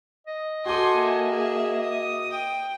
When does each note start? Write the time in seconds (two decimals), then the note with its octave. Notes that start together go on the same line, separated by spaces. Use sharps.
0.27 D#5
0.66 F#4 A4 G#5 C6 D6 G6
0.96 A#3 E5
1.31 G#4
1.81 D#6
2.31 G5